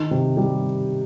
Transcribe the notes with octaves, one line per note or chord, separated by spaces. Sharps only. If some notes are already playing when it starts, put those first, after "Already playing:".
Already playing: D#3
C3
G3